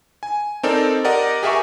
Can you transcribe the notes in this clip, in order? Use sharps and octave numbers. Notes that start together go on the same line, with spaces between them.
G#5
C4 D#4 A4 A#4 D5
G4 A#4 D5 D#5 F#5
G4 G#4 A#4 E5 G#5 C#6